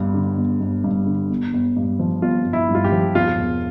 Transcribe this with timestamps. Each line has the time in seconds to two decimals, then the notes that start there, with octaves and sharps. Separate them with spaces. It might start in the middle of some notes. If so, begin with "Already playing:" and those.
Already playing: G1 G2
0.14 D3
0.37 G1
0.60 G1
0.84 G2
1.07 D3
1.30 G1
1.53 G1
1.76 G2
2.00 F3
2.22 G1 F4
2.46 G1
2.53 E4
2.69 G2
2.75 F4
2.84 G4
2.92 F3
3.15 E1 F4
3.39 E1